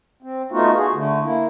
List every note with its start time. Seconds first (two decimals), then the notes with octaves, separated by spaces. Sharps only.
0.23 C4
0.52 A3 B3 D#4 F4 F#4
0.75 F#4 G#4
0.94 D3 A3
1.22 A#3 E4